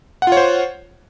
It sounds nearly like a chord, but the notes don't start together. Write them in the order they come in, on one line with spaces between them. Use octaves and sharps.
F#5 F4 C#5 C5